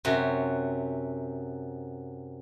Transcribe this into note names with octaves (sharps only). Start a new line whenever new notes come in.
F#2 C3 F#4